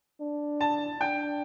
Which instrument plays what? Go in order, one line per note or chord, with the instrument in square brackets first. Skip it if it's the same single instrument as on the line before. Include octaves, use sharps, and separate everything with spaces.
[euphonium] D4
[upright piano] A5
[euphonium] D4 [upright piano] G5